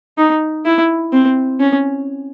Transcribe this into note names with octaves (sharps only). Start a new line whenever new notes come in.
D#4
E4
C4
C#4